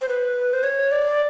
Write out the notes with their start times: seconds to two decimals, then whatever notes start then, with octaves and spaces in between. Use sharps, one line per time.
0.01 C5
0.09 B4
0.53 C5
0.63 C#5
0.91 D5